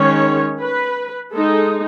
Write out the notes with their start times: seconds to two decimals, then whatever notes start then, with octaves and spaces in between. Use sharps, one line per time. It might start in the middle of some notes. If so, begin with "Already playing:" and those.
Already playing: D#3 G#3 C#4 C#5
0.60 B4
1.32 G#3 D#4 A4